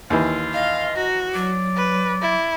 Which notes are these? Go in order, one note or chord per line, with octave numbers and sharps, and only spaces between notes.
D#2 E3 F4
D#5 F5
F#4 A#5
F#3 D5
B4
E4